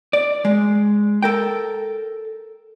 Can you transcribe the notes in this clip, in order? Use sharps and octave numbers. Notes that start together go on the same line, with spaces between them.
D5
G#3
A4 A#4 G5